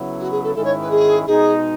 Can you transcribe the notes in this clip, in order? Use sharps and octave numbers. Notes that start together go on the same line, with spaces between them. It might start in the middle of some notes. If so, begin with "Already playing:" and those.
Already playing: C#3 F#3 B3 E4
F#4
G#4
A4
G#2 D#3 G#3 C#4 E4 A4
C#5
B4
G#4
B2 G#3 D#4 G#4